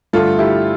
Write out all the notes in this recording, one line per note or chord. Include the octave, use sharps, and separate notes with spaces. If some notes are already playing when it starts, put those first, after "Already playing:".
G2 D3 A3 F4 A4
E4 G4